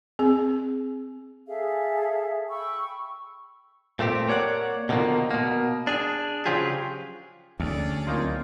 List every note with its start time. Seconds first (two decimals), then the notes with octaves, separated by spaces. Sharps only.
0.19 C4 G#4
1.47 G#4 A4 E5 F5
2.49 G5 B5 C#6 E6
3.99 A#2 A3 C4 G4
4.28 A#3 C#5 D5 F#5
4.89 B2 D3 D#3 F3 A#3
5.31 B2 A#3
5.87 D4 G#4
6.46 C#3 F3 F#3 F4 G4 G#4
7.60 D2 C#4 G#4 D5
8.07 C#2 F#3 A#3 C4 D#4 F4